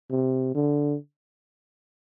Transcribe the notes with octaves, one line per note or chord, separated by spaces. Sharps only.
C3
D3